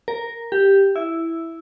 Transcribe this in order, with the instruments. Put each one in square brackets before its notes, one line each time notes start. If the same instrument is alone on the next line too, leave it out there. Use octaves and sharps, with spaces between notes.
[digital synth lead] A#4
G4
E4